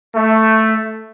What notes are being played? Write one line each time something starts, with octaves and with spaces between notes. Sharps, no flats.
A3